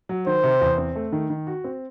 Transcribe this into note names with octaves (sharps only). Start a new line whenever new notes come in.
F#3
D#3 C5
C3
E2
C4
A3
D#3
D#3
F#4
C4